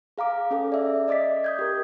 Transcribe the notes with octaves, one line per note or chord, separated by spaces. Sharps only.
G#4 F5 A#5 D6
C#4 G#4 A4
D5 E5
D5 D#5 D6 A6 B6
D#6 G6 G#6
G4 A#4